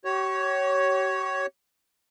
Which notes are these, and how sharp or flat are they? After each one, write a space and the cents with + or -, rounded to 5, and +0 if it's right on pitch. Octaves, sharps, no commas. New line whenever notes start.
G4 -45 C#5 +0